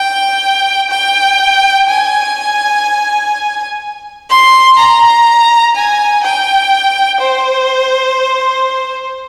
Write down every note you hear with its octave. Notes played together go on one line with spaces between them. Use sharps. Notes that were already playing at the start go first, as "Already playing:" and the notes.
Already playing: G5
G5
G#5
C6
A#5
G#5
G5
C5